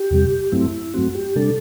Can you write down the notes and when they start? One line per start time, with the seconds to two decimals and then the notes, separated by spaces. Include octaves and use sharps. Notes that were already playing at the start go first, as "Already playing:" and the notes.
Already playing: G4
0.11 E2 C3 G3
0.52 G2 F#3 A3 C4 E4
0.94 G2 F#3 A3 C4 F#4
1.15 G4
1.35 C3 G3 D4 A4